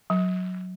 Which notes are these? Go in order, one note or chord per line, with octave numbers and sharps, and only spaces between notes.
F#3